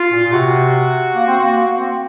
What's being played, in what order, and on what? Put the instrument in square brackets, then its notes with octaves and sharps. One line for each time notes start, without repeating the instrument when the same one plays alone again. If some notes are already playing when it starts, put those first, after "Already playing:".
Already playing: [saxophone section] F4
[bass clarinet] A#2
A#2
[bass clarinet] C3 [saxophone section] F#4
[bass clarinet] A#3
C4
A#3
A#3
A#3
C4